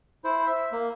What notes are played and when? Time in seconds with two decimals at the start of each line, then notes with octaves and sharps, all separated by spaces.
0.24 E4 C5
0.46 E5
0.72 A#3